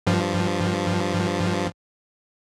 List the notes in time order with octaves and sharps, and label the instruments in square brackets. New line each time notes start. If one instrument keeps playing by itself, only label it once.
[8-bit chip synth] G2 F3